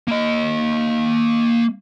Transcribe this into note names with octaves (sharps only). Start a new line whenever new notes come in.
A#3 D#5